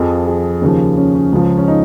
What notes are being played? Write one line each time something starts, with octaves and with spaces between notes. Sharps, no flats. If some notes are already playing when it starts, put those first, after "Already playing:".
Already playing: F2 F3 G#4
G#4
D#2 C#3 F3
C#4
C#4
C#2 C#3 F3
C#4
D#4